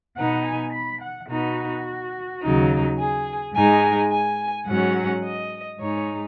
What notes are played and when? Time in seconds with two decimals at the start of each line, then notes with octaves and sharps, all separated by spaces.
0.16 B2 B3 D#4 F#5
0.45 G#5
0.73 B5
1.01 F#5
1.29 B2 B3 D#4 F#4
2.42 D#2 C#3 F#3 D#4
2.98 G#4
3.54 G#2 G#3 D#4 G#5
4.11 G#5
4.67 G#2 F#3 C#4 F#5
5.23 D#5
5.79 G#2 G#3 D#4 C#5